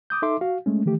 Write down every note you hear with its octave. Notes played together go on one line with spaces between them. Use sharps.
D6 D#6 G6
D#4 A4 E5 C6 D6
F#4 F5
G#3 A3 C#4
D#3 E3 A3 G4